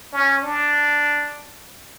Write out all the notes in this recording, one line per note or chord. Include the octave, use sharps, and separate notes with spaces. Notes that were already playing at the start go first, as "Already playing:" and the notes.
C#4
D4